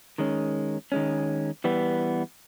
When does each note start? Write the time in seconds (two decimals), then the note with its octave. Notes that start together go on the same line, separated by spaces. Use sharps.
0.18 D#3 G#3 C#4
0.92 D#3 G#3 C#4
1.64 E3 G3 B3